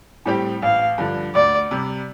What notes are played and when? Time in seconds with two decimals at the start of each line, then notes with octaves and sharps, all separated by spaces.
0.25 A2 G3 C4 G4
0.62 A1 F5
0.98 G2 D3 F3
1.35 D2 D5
1.71 C3 G3